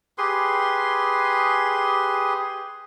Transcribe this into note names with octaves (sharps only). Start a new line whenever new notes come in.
G4 G#4 B4 C6